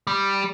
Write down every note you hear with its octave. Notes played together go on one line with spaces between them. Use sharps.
G3